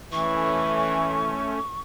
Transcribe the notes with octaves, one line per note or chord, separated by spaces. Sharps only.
E3 A3 C#4 C#6